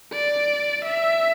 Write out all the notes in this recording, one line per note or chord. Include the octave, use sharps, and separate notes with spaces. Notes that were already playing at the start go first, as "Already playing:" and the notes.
D5
E5